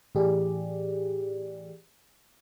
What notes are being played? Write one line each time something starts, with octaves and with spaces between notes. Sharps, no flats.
A2 E3 G4 G#4 D5